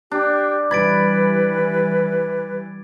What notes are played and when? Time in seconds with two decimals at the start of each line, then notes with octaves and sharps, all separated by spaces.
0.11 D4 G4
0.71 E3 G3 B4 B5 G#6 A6 D7